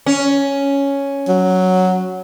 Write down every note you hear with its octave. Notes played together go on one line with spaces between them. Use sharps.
C#4
F#3